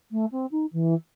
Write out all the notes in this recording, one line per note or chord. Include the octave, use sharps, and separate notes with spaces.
A3
C4
D#4
E3